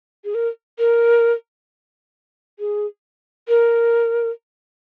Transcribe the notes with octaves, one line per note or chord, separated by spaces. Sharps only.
G#4
A#4
A#4
G#4
A#4